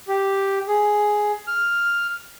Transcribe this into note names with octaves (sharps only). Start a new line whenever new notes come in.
G4
G#4
F6